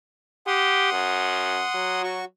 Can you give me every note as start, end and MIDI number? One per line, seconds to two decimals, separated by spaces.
0.47 0.90 67
0.47 2.02 78
0.47 2.02 84
0.47 2.02 87
0.92 1.62 42
1.74 2.23 54
2.03 2.25 66
2.03 2.25 85